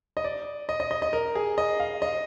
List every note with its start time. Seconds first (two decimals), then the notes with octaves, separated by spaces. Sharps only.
0.17 D#5
0.24 D5
0.69 D#5
0.80 D#5
0.91 D#5
1.02 D#5
1.13 A#4
1.35 G#4
1.58 D#5
1.80 F5
2.02 D#5